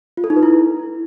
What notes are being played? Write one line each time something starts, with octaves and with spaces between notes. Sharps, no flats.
F4
A4
D#4
B4
E4